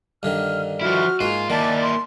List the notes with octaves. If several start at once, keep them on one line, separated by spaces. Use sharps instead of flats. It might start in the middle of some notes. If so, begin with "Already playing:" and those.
G2 D3 D#3 F6
F3 E4 F#4 F6
G#2 A#3 F4 G#5
D#3 A#3 E4 D5 A5
C6